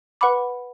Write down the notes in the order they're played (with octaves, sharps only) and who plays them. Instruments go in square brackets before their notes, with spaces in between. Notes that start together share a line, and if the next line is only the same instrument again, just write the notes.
[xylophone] B4 F#5 B5 D6